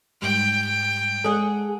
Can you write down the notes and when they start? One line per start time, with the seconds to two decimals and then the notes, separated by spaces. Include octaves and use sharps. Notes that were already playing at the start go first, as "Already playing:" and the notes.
0.22 G#2 G3 G5
1.24 G#3 G#4 A4 F#5